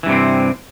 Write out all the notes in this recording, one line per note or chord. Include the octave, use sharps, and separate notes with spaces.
G2 C3 E3 C4